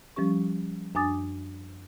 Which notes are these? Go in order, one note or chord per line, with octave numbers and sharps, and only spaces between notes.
F3 G3 C#4 G4 C#6
F#2 D4 G#5 D6 D#6 A6